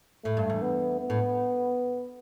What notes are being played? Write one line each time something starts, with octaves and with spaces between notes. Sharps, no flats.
A2 A3
G2
E2
B3
B3
A2